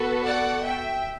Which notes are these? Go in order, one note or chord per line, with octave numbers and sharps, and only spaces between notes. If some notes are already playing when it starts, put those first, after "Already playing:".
Already playing: B3 F#4 A4 B4
D5 F#5
E5 G5